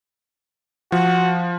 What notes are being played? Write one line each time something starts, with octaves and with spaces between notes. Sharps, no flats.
F3 F#4